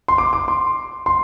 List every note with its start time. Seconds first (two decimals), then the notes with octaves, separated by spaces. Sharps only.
0.08 C6
0.18 D6
0.33 D6
0.48 C6
1.06 C6